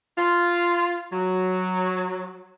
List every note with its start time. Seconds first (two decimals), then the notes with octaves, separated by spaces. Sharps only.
0.17 F4
1.12 F#3